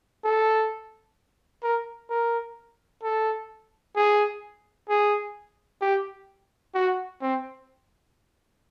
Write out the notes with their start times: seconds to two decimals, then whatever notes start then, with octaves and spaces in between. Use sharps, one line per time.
0.25 A4
1.63 A#4
2.10 A#4
3.03 A4
3.96 G#4
4.89 G#4
5.82 G4
6.75 F#4
7.22 C4